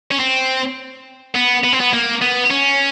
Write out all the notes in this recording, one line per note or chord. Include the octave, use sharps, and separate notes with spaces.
C#4
C4
B3
B3
C4
B3
A#3
B3
C#4